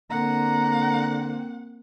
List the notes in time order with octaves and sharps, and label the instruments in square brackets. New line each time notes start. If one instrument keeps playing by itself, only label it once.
[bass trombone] D3 [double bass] A#3 C4 [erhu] F#5 [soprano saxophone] A#5